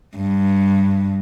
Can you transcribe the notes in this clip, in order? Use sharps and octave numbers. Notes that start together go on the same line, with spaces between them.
G2